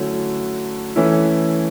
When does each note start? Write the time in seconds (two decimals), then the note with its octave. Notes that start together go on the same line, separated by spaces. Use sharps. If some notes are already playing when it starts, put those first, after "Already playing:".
Already playing: D3 F#3 A3 C#4 E4
0.96 E3 A3 C#4 E4